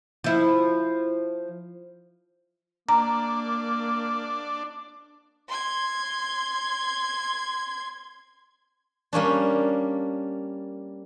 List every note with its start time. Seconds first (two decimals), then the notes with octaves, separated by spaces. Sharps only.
0.24 F3 E4
2.89 A#3 D4 A#5
5.48 C6 G#6
9.13 G3 A#3 C#4 D4